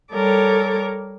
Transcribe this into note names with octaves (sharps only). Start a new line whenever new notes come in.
G3 A4 A#4 C#5 D6